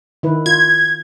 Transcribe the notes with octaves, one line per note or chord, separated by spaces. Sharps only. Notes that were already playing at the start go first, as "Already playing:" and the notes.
D#3 E4 B4
F4 G#6